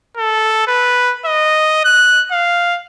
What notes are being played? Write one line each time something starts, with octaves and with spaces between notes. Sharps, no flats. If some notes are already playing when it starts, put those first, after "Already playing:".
A4
B4
D#5
F#6
F5